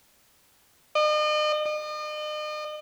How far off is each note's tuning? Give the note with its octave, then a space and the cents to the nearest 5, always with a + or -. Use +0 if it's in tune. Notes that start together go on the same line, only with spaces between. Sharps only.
D#5 -40
D#5 -40